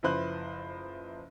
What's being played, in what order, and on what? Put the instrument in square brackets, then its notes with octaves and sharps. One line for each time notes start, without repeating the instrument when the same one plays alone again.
[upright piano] F#1 F3 E4 B4 C5 F#6